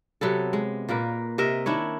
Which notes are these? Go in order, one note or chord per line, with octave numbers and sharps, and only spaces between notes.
C3 F#3 B3 A4
G#3
A#2 A#3 A#4 B4
C3 A#4 D#5 E5
D#3 D4 E4 C#5